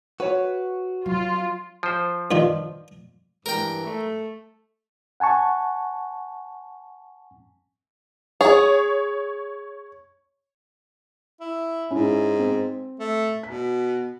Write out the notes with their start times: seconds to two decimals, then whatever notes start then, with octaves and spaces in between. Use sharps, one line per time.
0.20 F#4 B4 C#5
1.06 F#3 F4
1.83 F3 C5
2.31 G2 D#3 F4
3.46 G2 E3 A#4 G5
3.84 A3
5.20 F#5 G#5 A5 C#6
8.41 G#4 C#5
11.41 E4
11.91 G#2 C#4 E4
12.39 C4
13.00 A3
13.43 B2 B6